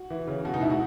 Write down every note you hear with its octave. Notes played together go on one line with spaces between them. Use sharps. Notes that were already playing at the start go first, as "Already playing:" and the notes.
Already playing: F#4
E3
C#3
B2 F#4
D#4
C#2 E4
F#4